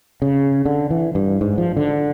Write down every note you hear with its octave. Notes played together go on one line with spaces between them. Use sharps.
C#3
D3
E3
G2
G#2
F3
D3